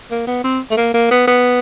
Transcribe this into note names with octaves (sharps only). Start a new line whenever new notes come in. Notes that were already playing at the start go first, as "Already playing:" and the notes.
A#3
B3
C4
A3
A#3
A#3
B3
B3